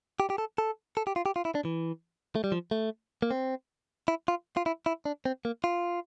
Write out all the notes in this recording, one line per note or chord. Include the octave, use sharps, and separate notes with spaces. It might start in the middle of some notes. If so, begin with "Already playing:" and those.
G4
G4
A4
A4
A4
G4
F4
G4
F4
E4
D4
E3
A3
G3
F3
A3
A#3
C4
E4
F4
F4
E4
E4
D4
C4
A#3
F4